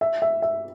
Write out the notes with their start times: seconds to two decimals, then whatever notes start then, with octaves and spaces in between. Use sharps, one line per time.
0.01 E5
0.22 E5
0.42 E5